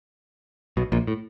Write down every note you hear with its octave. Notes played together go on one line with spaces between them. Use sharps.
B1 B2
A#1 A#2
A2